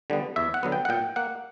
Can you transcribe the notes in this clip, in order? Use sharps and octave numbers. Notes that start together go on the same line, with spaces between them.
D3 G3 B3
E2 E5
F#5
D3 F#3 B3
G5
F#5
A#2 G5
A#3 F#5